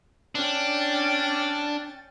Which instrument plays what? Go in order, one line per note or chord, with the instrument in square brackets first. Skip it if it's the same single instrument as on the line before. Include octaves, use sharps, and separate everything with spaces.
[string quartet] C#4 G5 A6 [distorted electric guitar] D4